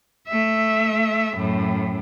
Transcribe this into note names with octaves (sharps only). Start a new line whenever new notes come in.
A3 E5
F#2 A2